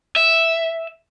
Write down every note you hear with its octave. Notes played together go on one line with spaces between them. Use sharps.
E5